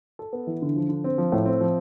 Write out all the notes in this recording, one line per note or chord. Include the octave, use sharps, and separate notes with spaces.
A4
B3
E3
D3
F3
D3
C4
F3
A2
C4
F3